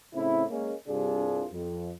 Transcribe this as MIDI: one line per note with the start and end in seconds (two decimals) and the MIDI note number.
0.14 0.44 45
0.14 0.44 49
0.14 0.44 60
0.14 0.44 64
0.49 0.73 56
0.49 0.73 58
0.49 0.73 61
0.88 1.45 36
0.88 1.45 43
0.88 1.45 48
0.88 1.45 62
0.88 1.45 65
0.88 1.45 68
1.51 1.90 41